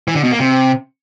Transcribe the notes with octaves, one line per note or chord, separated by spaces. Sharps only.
E3
D3
B2
A#3
C3